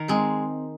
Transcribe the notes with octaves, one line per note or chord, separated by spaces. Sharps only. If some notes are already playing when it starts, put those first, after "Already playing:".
Already playing: D#3 A#4
G#3 C4